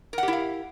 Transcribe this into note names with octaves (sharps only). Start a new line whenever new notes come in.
E4 G4 A#4 F5 F#5